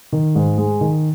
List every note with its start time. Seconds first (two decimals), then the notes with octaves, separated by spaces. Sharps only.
0.13 D#3
0.35 G#2
0.58 G#3
0.81 D#3